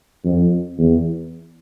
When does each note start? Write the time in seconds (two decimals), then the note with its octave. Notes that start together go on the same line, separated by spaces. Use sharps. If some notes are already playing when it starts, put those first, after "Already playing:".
0.25 F2
0.78 E2